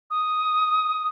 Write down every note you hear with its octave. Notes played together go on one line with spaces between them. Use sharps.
D#6